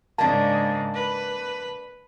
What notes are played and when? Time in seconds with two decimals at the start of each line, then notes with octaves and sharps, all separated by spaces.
0.18 G#2 C#3 A#3 D4 A5
0.94 B4